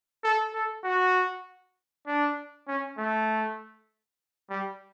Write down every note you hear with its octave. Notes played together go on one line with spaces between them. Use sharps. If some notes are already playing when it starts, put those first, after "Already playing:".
A4
A4
F#4
D4
C#4
A3
G3